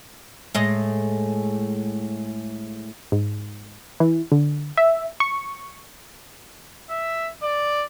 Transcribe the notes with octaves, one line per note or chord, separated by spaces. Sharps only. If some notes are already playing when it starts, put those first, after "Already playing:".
A2 G#3 D#5
G#2
E3
D3
E5
C#6
E5
D5